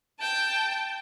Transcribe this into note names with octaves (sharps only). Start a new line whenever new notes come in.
G5 A5